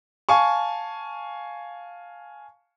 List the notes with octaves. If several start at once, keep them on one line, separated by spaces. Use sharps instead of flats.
F5 G#5 A5 C#6